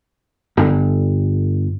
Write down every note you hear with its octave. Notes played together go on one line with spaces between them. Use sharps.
G1